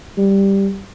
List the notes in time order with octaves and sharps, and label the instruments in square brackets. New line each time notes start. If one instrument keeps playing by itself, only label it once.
[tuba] G3